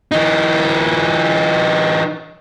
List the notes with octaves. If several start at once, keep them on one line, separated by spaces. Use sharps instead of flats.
E3 D#4